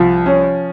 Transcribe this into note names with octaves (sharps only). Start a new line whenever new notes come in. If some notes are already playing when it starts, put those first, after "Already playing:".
Already playing: C2 F3
C#4